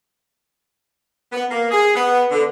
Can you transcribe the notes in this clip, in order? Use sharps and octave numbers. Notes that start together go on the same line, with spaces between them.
B3
A#3
G#4
B3
D3